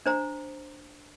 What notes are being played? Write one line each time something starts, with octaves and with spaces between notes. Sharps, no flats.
D4 C5 A#5